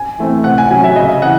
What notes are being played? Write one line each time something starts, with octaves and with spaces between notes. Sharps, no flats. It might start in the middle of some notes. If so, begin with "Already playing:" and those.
Already playing: G#5
E3 A3 C4
C3 F#5
G#5
F#3 C#4 G#5
E5
C#3 D#5
E3 F#5